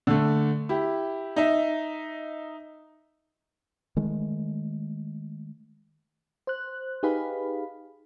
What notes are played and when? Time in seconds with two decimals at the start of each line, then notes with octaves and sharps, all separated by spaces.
0.07 D3 A3
0.69 E4 G4
1.36 D#4 D#5 E5
3.96 D#3 G#3 A3
6.47 C5 F#6
7.03 D#4 G4 G#4 B4 F5 B5